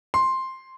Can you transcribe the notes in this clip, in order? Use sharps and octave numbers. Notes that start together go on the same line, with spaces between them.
C6